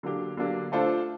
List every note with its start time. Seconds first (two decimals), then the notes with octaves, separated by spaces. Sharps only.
0.03 D3 F#3 A#3 D4 G4
0.37 D3 F#3 A#3 D4 G4
0.72 A3 D4 F4 A4 C5